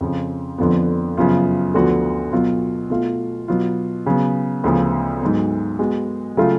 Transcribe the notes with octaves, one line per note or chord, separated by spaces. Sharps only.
F2 C#3 F3
F2 D3 F3 B3
F#2 C#3 F3 B3 F4
D2 D3 F3 B3 F#4
B2 F#3 B3 F4
B2 A3 F4
B2 F#3 B3 F4
C#3 F#3 B3
D2 C#3 F3 B3 F4
G#2 F#3 B3
G#3 B3 F#4
C#3 F#3 A3 F4